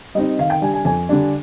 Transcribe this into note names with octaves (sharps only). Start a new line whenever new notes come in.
G3 C4 D#4 D#5
D#3 F5
G5
G3 D4 G#5
G#5
F2 G#5
D3 G3 D4